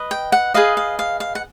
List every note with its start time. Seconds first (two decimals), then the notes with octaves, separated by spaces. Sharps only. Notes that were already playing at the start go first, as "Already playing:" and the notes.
Already playing: B4 D#5
0.11 G5
0.32 F#5
0.54 G#4 B4 D#5 F5
0.77 F5
0.99 F5
1.20 F5
1.35 F#5